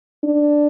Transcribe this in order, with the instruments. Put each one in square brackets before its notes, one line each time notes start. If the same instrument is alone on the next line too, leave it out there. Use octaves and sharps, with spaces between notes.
[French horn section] D4